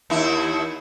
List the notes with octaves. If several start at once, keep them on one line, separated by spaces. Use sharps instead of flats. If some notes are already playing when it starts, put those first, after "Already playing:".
D#2 E4